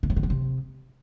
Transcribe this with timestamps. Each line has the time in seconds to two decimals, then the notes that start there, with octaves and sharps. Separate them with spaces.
0.03 D#3
0.10 F#3
0.16 D#3
0.23 F#3
0.30 C3